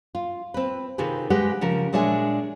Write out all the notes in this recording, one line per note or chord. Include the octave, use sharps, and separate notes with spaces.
F4
C4 B4
C3 D#3 F4 G4 G#4 B4
G#3 G4 B4 D#5 F#5
C#3 F3 A#4
A#2 G#3 D4 C#5 E5 G#5